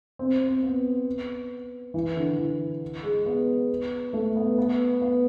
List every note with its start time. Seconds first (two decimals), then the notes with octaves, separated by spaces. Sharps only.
0.19 C4
0.41 C4
0.63 B3
1.94 E3
2.16 D3
2.38 E3
3.03 G#3
3.26 B3
4.13 A3
4.36 B3
4.58 B3
5.01 B3